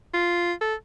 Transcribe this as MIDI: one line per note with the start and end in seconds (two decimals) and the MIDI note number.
0.14 0.53 65
0.61 0.75 69